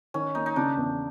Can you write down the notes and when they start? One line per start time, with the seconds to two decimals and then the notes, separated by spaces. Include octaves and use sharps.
0.14 D#3 C#4
0.35 A#3 D#4
0.46 D#4
0.56 C#3 D4
0.77 E2